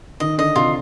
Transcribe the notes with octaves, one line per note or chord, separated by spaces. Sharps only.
D#3 D#5
D3 D#5
C3 F4